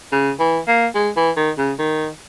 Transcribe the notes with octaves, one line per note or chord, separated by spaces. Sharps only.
C#3
E3
A#3
G#3
E3
D#3
C#3
D#3